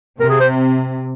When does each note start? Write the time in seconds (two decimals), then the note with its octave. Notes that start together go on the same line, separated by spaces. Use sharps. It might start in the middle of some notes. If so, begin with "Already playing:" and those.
0.19 C3 A#4
0.30 G#4
0.40 C5